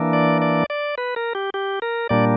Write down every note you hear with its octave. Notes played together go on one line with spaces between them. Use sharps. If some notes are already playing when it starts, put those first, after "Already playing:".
Already playing: E3 A#3 D4
D5
D5
D5
B4
A#4
G4
G4
A#4
A#2 G3 A#3 D4 D5